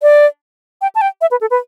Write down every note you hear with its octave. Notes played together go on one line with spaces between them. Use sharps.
D5
G5
A5
G5
E5
B4
A4
B4